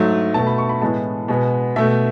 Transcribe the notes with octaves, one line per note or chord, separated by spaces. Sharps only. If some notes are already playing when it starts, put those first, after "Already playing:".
Already playing: G#2 F#3 A3
B2 A3 A5
B5
C#6
B5
A2 E3 G#3 B3 A5
B2 G#3 B3
B2 A3 E5